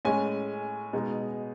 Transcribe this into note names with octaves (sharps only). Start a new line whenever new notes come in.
A2 G#3 C#4 G#5
B2 G#3 D#4